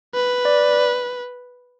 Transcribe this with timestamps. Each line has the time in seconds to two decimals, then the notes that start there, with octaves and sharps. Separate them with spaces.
0.15 B4
0.45 D5